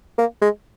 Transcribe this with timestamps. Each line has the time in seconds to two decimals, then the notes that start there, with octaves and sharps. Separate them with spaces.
0.18 A#3
0.41 G#3